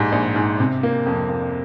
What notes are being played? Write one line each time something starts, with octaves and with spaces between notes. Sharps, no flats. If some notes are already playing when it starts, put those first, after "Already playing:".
Already playing: A#1 G#2 G4
A#1
G#2
C3
A#3
F2
A#3